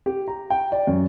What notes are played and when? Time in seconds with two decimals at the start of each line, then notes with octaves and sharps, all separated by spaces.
0.06 G4
0.28 A#5
0.50 G5
0.72 D5
0.87 F#2